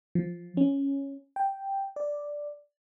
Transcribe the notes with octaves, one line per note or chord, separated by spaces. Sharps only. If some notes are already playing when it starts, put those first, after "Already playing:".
F3
C#4
G5
D5